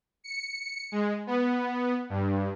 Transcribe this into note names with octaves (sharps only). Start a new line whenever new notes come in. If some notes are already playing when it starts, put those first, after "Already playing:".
C#7
G#3
B3
G2